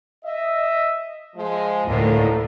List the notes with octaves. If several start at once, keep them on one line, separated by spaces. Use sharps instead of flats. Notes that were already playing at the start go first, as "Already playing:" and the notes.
D#5 E5
F3 G#3
D2 A2 D3 D#3 A#3